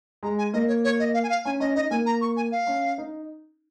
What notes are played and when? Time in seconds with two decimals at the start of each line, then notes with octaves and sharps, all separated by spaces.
0.23 G#3 A#5
0.39 G#5
0.53 A#3 D#5
0.68 C#5
0.84 C#5
0.99 D#5
1.14 F5
1.24 G#5
1.30 F5
1.45 C#4 G#5
1.60 C#4 D#5
1.75 D#4 D#5
1.91 A#3 G#5
2.06 A#5
2.21 C#6
2.37 G#5
2.52 F5
2.67 C#4
2.98 D#4